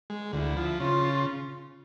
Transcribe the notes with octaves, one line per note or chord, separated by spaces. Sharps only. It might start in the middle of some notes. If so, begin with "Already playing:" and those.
G#3
D2 E4
F3
C#3 F4